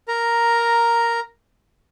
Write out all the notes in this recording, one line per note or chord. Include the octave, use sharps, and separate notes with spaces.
A#4 A#5